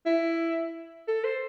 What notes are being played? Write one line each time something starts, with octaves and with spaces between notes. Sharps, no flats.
E4
A4
C5